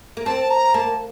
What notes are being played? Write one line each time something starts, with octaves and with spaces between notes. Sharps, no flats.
A#3
C4 A5
A#5
A#3 A5